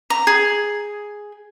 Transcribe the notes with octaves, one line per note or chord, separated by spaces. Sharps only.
A#5
G#4